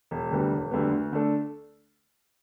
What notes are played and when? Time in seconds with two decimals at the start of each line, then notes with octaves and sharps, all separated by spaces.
0.11 E1
0.31 D2 D3 G3 B3
0.52 E1
0.71 D2 D3 G3 B3
0.92 D2
1.12 D3 A3 D4 A4